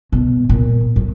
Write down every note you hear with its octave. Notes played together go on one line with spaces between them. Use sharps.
B2
A#2
F#2